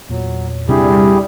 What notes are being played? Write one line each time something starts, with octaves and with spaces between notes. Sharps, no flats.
E2 A#2 F#3
C3 G3 D4 E4 G4 G#4